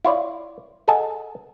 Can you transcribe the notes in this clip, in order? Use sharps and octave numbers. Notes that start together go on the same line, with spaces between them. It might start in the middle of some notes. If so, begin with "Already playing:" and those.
E4 F4 C#5 D5
G#4 A4 D#5 F#5 G#5 A5